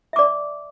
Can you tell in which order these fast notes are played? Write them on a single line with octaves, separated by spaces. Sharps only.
E5 D6 D5